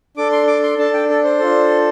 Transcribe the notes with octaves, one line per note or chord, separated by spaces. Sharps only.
D4 A4 D6
C6
D6
C6
D4 A4 A5
G5
A4
C5
D4 F4 A4